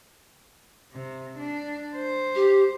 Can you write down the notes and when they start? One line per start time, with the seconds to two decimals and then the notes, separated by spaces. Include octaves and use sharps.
0.93 C3
1.39 D4
1.95 C5
2.35 G4